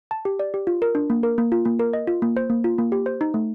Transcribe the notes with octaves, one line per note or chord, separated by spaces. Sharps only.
A5
G4
D5
G4
F4
A#4
D4
A#3
A#4
A#3
F4
A#3
A#4
D#5
F4
A#3
C5
A#3
F4
A#3
G4
C5
D#4
A3